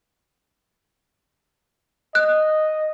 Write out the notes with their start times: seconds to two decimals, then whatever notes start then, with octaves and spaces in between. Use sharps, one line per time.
2.15 D#5 F#6